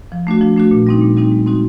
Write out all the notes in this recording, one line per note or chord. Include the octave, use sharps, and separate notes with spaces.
F3
A3 D4 F#4
F3
A3 D4 F#4
A#2
G3 C4 D#4
A#2
G3 C4 D#4
G#3
C4 D#4 F#4